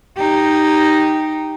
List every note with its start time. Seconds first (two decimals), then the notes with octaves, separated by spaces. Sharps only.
0.17 D#4 G4